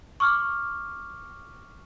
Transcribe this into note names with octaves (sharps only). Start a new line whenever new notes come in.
C#6 D6 F6